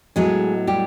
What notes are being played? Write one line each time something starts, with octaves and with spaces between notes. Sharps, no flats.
A2 F#3 G#3 B3 G#4
G3 G4